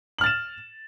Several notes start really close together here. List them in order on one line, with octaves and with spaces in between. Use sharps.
F#7 F6 A6 E7